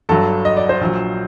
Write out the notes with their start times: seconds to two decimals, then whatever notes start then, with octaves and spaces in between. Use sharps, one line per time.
0.09 G1 G2 F#3 A4
0.45 D#5
0.57 D5
0.69 C5
0.81 A#1 A#2 F#3